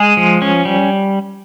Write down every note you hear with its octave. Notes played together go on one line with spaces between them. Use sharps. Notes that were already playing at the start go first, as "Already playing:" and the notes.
Already playing: G#3 G#4
F3
C#4
G3